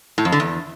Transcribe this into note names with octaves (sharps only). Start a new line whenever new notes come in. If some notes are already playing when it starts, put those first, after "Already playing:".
A2
F2
D3
E2